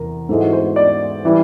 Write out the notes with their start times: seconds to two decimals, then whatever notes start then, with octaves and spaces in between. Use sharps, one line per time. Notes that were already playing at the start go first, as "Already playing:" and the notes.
Already playing: E2 C3 A#4
0.29 G#2 E3 G#3 A4
0.40 F#4
0.53 C5
0.76 D5
1.25 E3 G3